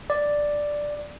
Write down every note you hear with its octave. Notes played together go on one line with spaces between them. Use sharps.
D5